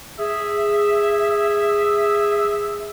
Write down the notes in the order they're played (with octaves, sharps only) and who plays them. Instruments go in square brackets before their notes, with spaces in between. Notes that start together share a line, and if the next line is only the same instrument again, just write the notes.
[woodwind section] G#4 E5